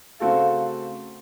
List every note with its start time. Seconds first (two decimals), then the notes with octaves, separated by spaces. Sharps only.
0.20 C#3 A3 C4 F#4 A4 F5